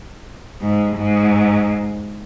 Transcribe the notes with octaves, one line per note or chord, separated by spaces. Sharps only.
G#2
G#2